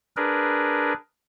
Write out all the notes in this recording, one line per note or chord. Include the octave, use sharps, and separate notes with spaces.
D4 G#4 A#4 B4